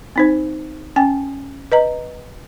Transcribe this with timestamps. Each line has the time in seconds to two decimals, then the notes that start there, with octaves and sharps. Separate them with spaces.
0.16 C4 D#4 C5
0.96 C#4 G5 G#5
1.72 B4 D#5 A#5